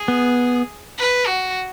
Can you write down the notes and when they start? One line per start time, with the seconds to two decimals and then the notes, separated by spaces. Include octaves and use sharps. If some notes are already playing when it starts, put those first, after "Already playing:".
Already playing: G#4
0.08 B3
0.98 B4
1.27 F#4